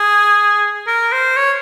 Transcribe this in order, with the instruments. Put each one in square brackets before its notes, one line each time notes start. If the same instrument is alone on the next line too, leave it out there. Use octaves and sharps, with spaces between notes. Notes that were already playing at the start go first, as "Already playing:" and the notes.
Already playing: [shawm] G#4
A#4
C5
C#5